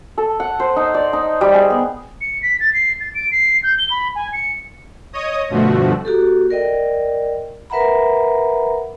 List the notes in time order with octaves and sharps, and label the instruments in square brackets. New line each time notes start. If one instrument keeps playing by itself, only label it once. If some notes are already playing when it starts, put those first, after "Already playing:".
[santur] A4
F#5
C5
D#4
D5
D#4
G3
G#4
B3
[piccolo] C#7
B6
A6
C7
A6
D7
C7
G6
G7
B5
G#5
C#7
[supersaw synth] C#5 D#5 D#6
G2 B2 D3 F3 A3 F#4
[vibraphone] A#3 F#4 G4 A4
A#4 D5 D#5 G5
A#4 B4 E5 F#5 A#5 B5